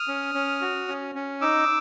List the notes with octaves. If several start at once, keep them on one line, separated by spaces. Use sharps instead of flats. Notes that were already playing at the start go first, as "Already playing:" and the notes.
Already playing: D#6 F6
C#4
C#4
F#4
C#4
C#4
D#4 D6 E6